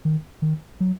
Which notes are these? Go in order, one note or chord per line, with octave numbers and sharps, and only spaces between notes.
D#3
D#3
F#3